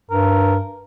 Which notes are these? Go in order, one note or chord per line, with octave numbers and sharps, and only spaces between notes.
G2 A#4